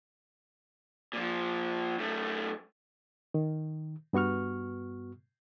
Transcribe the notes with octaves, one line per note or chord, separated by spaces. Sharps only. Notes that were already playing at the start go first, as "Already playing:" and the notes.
A#2 F3
F#2 A3
D#3
G2 B3 F#4 C#6 F6